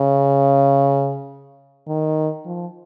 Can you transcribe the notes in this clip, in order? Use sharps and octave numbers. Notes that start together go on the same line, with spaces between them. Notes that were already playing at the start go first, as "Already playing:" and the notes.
Already playing: C#3
D#3
F3